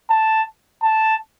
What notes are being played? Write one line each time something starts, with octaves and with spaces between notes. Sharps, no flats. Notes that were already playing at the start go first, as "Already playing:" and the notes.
A5
A5